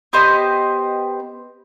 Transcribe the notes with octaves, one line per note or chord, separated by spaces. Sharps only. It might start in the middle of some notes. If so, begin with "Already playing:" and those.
B3 G4 C5 D#5